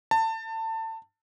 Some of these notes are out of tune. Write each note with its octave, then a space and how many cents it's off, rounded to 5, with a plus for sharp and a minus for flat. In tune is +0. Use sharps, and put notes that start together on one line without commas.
A5 +25